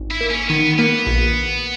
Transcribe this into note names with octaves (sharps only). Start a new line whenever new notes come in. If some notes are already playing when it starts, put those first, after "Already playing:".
Already playing: G#1
E4
A#3
C#4
D#3 B3
A#3 B3
A#1